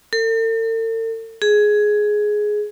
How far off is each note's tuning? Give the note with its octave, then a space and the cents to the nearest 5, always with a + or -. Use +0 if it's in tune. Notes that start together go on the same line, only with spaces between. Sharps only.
A4 +45
G#4 +10